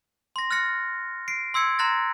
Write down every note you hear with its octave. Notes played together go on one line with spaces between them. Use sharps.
C6 A#6
F6 F#6 A6 A#6 C#7
C7 D7
C6 E6 G#6 C#7
A#5 C6 F#6 A6 A#6